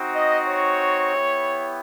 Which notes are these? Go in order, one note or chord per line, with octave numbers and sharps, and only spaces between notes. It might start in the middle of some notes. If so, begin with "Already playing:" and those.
Already playing: C4 D#4 F#4
D#5
C#5
B3 E4 G4